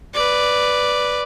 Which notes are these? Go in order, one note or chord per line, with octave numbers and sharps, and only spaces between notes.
B4 D5